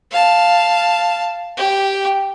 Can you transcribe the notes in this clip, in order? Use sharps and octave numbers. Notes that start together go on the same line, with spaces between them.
F5 A5
G4